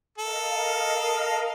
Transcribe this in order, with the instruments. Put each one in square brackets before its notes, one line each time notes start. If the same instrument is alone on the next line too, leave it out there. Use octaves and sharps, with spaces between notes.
[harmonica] A4 [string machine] A#4 D#5 F5